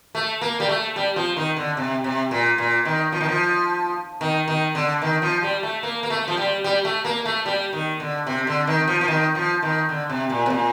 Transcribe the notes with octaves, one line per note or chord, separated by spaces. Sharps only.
A3
A#3
G3
A3
G3
F3
D#3
D3
C3
C3
A#2
A#2
D#3
F3
D#3
F3
D#3
D#3
D3
D#3
F3
G3
A3
A#3
A#3
A3
F3
G3
G3
A3
A#3
A3
G3
D#3
D3
C3
D3
D#3
F3
F3
D#3
F3
D#3
D3
C3
A#2
C3
A#2